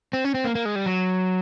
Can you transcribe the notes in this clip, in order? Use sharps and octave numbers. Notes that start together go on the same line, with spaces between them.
C4
C#4
C4
A#3
A#3
G#3
G3
F#3